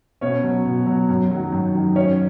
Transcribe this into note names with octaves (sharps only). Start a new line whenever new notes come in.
B2 C#4 C#5
F#3
B2
F#3
F#2
D#3 F#3
F#2
D#3 F#3
F#2 C#4 C#5